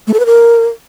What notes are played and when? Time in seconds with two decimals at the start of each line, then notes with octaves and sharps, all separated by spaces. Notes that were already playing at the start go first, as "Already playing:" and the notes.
0.07 A3
0.14 A4
0.20 B4
0.26 A#4